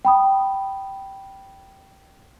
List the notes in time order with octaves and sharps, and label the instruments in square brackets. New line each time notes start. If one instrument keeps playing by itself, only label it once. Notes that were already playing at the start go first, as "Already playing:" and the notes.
[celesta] G5 B5 D#6